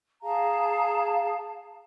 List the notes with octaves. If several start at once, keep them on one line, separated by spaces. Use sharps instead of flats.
G#4 F5 A5 A#5